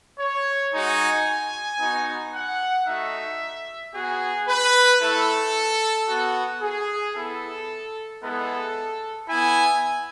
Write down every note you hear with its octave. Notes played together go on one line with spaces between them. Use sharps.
C#5
G#3 D#4 F#4 G#5
B3 D#4 F#4
F#5
A3 D#4 F#4 E5
B3 F#4 G#4
B4
A3 E4 A4
B3 F#4
G#4
B3 E4 A4
G#3 B3 E4 A4
B3 E4 G#5